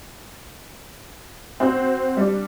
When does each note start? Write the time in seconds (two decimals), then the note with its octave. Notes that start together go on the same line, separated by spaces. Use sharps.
1.60 C4 F#4 C5
2.17 G3 D4